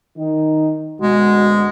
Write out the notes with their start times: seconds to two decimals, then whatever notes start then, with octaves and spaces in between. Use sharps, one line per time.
0.18 D#3 D#4
1.01 D2 B2 G#3 F#4